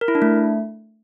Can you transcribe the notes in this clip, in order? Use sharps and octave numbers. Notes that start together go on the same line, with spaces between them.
A#4
E4
D4
A3